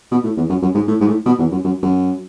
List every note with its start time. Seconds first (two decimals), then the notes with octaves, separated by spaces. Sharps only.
0.11 B2
0.24 A2
0.37 E2
0.49 F#2
0.62 F#2
0.75 G#2
0.88 A2
1.01 G#2
1.07 A2
1.26 B2
1.38 E2
1.51 F#2
1.64 F#2
1.82 F#2